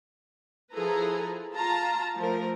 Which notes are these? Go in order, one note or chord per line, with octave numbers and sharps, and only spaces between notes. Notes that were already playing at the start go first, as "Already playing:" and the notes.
F3 E4 G#4 A4 B4 A#5
F4 A5 A#5
F3 A3 A#4